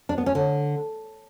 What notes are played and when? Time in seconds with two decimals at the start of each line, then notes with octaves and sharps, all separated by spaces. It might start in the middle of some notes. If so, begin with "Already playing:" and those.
0.09 D4
0.18 B3
0.26 C#4
0.35 D3